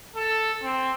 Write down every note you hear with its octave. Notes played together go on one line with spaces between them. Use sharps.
A4
C4